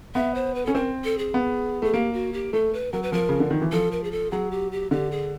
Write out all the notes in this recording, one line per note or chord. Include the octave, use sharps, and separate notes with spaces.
B3 E5
C5
B4
C#4 A4
C4 A#4
A4
G#4
B3
A3 G#4
A#3 G4
F#4
G4
A3 A4
B4
F#3 A#4
B4
F3 A#4
C#3
D3
D#3
E3
F3 A4
A#4
G#4
A4
F#3 G#4
G4
G4
D3 G4
G#4